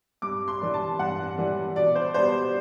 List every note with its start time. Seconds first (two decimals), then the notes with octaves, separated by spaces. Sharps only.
0.22 G2 D6
0.48 C6
0.61 E3 G3 D4
0.74 A5
0.99 G2 F#5
1.37 E3 G3 D4
1.76 B2 D5
1.95 C5
2.14 G3 B3 D4 C5